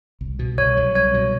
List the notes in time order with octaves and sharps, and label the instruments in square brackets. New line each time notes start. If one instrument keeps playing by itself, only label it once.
[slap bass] C2
B2
[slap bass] C2 [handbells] C#5
[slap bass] F#3
[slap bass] C2 [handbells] C#5
[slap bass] B2